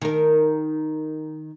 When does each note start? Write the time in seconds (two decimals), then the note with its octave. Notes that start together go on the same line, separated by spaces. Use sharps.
0.02 D#3 A#4